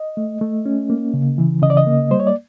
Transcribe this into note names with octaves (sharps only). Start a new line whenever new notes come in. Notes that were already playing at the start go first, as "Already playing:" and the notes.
Already playing: D#5
A3
A3
C#4
A#3
C#3
E3
C#3 D#5
D5
D#5
A#3
G3 C5
C#5
D5